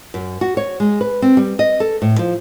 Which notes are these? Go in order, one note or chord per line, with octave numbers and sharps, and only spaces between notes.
F#2
F#4
C#5
G#3
B4
C4
G3
D#5
A4
A2
F3